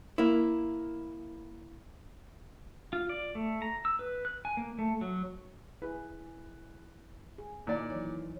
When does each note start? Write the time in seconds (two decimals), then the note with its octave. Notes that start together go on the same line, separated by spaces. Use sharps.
0.18 A#3 E4
2.93 F4
3.09 D5
3.35 A3
3.62 A#5
3.85 E6
3.99 B4
4.25 F#6
4.45 G#5
4.57 A#3
4.79 A3
5.01 F#3
5.82 E4 G#4 B4
7.38 G#4
7.67 A#2 D#3 D#4 E4 D5
7.90 E3 F#3 C#5